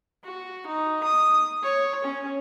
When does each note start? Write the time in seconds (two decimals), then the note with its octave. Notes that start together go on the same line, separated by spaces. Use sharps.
0.24 F#4
0.67 D#4
1.04 D#6
1.63 C#5
2.04 C#4